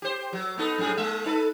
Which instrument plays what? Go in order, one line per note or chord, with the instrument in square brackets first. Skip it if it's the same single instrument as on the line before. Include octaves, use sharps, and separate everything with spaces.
[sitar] G4 C5
F#3
B3 D#4 A4
F#2 A2 G#4
G#3 E5
D#4 A4 B4